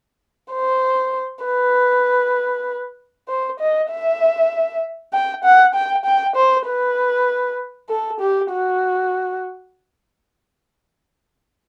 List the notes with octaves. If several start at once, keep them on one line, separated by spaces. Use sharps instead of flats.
C5
B4
C5
D#5
E5
G5
F#5
G5
G5
C5
B4
A4
G4
F#4